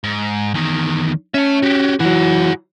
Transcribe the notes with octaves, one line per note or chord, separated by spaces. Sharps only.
G#2
E2 D#3
C#4 E5 A5
F#4 G4
E3 F#3 G#4 F#5